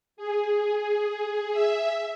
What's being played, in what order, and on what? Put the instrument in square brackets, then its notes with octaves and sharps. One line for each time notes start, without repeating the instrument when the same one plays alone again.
[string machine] G#4
E5